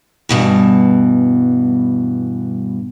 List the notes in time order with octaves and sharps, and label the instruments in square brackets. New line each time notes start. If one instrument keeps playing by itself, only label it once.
[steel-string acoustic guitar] G2 B2 E3